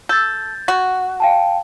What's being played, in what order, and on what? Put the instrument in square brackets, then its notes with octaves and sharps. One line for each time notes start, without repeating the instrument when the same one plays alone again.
[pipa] A4 [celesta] G6 A6
[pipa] F#4
[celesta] F5 G5 A5